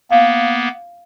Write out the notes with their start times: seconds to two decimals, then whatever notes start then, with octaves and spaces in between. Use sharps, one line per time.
0.11 A#3 B3 F5